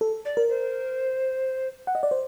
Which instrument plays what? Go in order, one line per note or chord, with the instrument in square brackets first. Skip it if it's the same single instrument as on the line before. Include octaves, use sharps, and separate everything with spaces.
[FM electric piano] A4
[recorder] D5
[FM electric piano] A#4
[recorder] C5
[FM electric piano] F#5
D#5
D5
C5